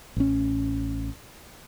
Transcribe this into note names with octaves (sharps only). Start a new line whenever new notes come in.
A1 C#4